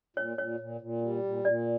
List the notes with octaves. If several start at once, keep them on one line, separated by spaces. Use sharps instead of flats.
A#2 C#5
A#2 C#5
A#2
A#2
G3
A#2
A#2 D5